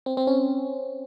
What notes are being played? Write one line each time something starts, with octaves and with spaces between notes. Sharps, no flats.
C4
C4
C#4